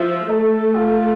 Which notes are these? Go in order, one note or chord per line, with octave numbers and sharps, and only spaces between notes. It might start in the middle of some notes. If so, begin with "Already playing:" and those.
Already playing: F3 E5
A3 A4
F4